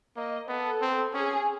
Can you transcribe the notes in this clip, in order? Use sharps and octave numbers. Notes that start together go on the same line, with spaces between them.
A#3 D#5
B3 A4
C4
C#4 G#4